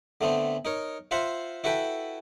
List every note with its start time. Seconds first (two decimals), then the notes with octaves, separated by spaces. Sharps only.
0.21 D3 A3 B3 C4
0.65 D#4 A#4 C#5
1.11 F4 C5 E5 F#5 A#5
1.64 E4 F#4 A4 B4 G5